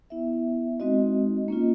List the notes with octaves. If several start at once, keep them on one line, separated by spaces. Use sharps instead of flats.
B3 E4 E5
G#3 C4 D#4 F#4 D#5
A#3 C#4 F4